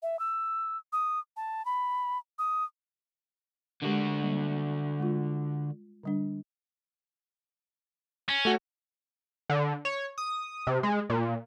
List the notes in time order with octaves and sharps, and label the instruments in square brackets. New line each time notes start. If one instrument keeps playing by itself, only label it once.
[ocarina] E5
E6
D#6
A5
B5
D#6
[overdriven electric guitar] D3 F#4 [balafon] G#3 G4 A#4
[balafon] G3 A#3
G#3 F4
D3 G3 D4
[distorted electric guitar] C#4
[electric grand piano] A3 F#4
[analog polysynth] D3
C#5
D#6
C3
G#3
A#2